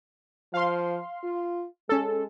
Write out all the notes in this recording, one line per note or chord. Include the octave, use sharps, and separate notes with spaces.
F3 F5 C6
F4
G#3 C#4 A4